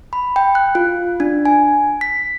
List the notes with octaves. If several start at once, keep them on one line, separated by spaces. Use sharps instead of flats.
B5
G5
F#6
F4
D4
G#5
B6